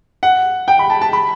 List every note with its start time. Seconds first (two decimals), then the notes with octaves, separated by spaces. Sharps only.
0.23 F#5
0.68 G5
0.79 B5
0.90 A5
1.01 A5
1.13 B5